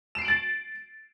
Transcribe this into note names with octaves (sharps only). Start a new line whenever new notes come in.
A6 C7 D7 E7 F#7